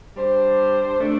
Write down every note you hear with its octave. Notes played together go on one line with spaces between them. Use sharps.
G3 D4 C5
C3 A3 D4